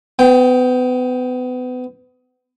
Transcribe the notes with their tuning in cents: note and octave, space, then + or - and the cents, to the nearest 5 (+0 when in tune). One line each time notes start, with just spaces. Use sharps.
B3 +30 G5 +0